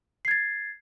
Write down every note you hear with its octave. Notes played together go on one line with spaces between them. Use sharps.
G#6 A6 C7